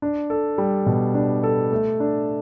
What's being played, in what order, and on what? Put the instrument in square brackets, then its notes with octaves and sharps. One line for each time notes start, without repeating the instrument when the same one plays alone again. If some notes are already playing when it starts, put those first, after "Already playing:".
[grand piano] D4
A4
G3
B2
D4
A4
A3
D4